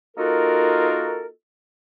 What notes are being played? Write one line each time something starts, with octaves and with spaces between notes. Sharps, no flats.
A#3 D#4 F4 F#4 A4 A#4